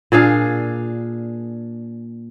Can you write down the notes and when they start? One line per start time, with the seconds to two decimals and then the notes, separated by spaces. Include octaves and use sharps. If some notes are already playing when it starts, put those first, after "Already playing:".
0.12 A#2 D4 G#4 F5